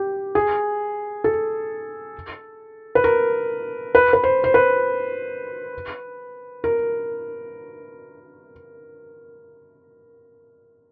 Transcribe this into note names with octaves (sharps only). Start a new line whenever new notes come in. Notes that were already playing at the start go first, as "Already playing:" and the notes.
Already playing: G4
G#4
A4
B4
A#4
B4
B4
C5
C5
B4
A#4